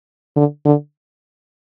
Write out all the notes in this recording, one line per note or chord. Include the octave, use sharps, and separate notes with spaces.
D3
D3